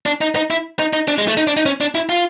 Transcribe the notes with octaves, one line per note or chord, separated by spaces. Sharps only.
D4
D#4
D#4
E4
D#4
D#4
D4
G#3
A3
D#4
D4
D#4
C#4
D4
E4
F4